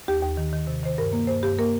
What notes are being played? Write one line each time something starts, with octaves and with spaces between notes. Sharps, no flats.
D#2 G4
D#2
D#3
D#3
C3
D#3 C5
G2 A#4
A#3
G2 C5
G2 G4
A#3 A#4